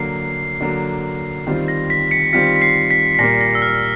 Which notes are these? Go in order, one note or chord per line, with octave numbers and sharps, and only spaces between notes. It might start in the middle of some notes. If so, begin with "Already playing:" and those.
Already playing: D3 F#3 A#3 C7
D3 F#3 A#3
D#3 G3 C4 F4
A#6
B6
B6 C#7
D#3 G3 C4 F4 B6 C#7
B6
C7
B6
B6
A#2 G3 A#3 A#6
A#6
E6
F6